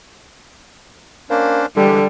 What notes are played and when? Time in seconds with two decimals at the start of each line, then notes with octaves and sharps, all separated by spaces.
1.30 A#3 C#4 D4 C5
1.77 D3 E3 G3 G#3 G4